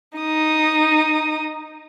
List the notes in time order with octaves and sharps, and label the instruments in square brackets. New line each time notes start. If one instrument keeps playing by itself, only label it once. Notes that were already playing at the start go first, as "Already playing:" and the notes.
[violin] D#4 D#6